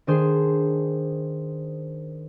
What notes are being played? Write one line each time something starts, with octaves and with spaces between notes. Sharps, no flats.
D#3 D4 G#4 C5